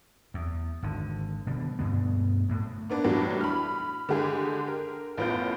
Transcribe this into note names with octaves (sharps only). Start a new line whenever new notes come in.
E2
G#1 D3
B2 D3 G3
D2 G2 B2 B3
D2 A2
A#3 B3 D4
A2 E3 F#3 G3 D4
B5 F6
D3 G#3 G4 G#4
A#4
A1 A2 B3 F4 G6